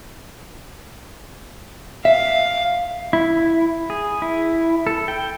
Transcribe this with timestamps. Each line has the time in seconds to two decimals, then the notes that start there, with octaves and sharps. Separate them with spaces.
2.05 E5 F5
3.13 E4
3.90 G#4
4.22 E4
4.87 A4
5.08 G5